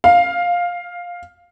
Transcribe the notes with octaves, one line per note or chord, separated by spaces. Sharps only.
F5